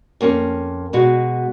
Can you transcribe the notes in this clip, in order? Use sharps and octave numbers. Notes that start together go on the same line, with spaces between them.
F2 A#3 C#4
B2 G#3 F#4